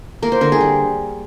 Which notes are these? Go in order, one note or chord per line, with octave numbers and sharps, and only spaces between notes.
A#3 A#4
C5
D3 A#4
G#4
G3